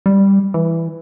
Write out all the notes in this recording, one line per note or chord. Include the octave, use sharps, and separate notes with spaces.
G3
E3